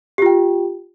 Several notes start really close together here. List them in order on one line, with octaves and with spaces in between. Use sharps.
G4 F4 G5